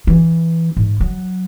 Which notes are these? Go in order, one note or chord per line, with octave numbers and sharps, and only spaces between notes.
E3
G#2
F#3